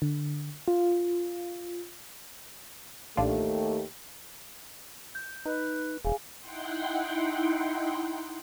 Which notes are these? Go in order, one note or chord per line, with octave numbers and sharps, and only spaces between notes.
D3
F4
A1 D#2 A3 D4 F4 G4
G6
D#4 B4
E1 G#4 F5 G#5
D#4 E4 F#5 G5 C6